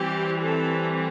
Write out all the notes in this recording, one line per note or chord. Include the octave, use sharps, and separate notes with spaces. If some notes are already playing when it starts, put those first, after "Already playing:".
Already playing: E3 G3 C4 G4
A4